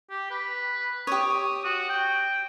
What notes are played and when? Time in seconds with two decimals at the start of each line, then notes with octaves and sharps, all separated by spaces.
0.10 G4
0.31 B4
1.07 G4 C#5 D#6
1.64 F#4
1.89 G5